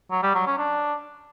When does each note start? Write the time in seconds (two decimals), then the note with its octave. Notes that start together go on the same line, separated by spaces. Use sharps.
0.11 F#3
0.23 G3
0.35 F#3
0.46 C#4
0.58 D4